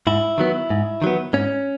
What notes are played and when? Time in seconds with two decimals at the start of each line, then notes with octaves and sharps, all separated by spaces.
0.07 G#2 E4
0.38 D#3 F#3 B3
0.70 G#2
1.02 D#3 F#3 B3
1.33 G#2 C#4